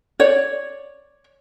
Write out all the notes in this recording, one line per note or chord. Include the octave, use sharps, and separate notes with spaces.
C#5 D5